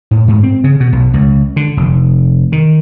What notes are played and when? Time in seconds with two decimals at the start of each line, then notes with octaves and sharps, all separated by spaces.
0.11 A2
0.28 G#2
0.43 C4
0.64 C#3
0.80 B2
0.93 B1
1.14 C#2
1.56 D3
1.77 F1
2.52 D#3